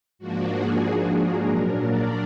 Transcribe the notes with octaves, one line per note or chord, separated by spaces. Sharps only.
G#2 F3 A#3 D4 F#4
G#4
F#4
A#4
A#2 F#3 D4
D5